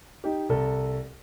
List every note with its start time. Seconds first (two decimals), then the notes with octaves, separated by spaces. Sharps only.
0.24 D#4 G4
0.49 C2 A4